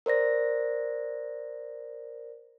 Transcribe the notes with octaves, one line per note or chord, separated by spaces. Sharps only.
A#4 C5 D5 A#6